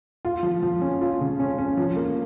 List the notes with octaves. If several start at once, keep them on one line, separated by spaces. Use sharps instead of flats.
F4
F3
F3
C#4
F4
C#3
C#4
C#4
F3
A#3